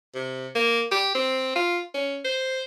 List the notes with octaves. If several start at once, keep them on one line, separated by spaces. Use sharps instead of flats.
C3
A#3
G4
C4
F4
C#4
C5